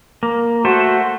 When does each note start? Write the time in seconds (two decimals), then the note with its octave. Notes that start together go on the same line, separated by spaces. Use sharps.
0.23 A#3
0.65 A3 F#4 C5